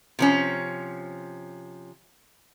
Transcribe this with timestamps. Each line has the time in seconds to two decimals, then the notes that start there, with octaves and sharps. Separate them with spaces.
0.19 C3 F3 C#4